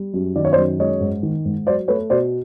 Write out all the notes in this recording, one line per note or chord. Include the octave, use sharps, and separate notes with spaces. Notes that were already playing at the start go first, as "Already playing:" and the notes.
Already playing: G3
F#2
D#3 D5
C#5
C5 D5
F#2
G#3 C#5 D#5
G#2
D#3
G#2
F#3 C5 D5
A3 B4 C#5
B2 C5 D5